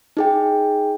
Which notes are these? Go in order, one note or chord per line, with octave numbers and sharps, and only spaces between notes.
D#4 G#4 G5